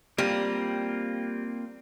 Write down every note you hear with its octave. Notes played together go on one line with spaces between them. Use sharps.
G3 A#3 C4 F4